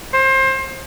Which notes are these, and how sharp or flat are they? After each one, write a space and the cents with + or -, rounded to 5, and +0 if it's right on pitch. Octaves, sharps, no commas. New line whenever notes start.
C5 +25